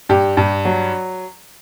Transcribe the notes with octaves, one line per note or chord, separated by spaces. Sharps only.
G2 G4
G2
F#3